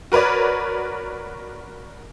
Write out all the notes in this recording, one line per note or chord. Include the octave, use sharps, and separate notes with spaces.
F#4 A#4 B4 C#5 D5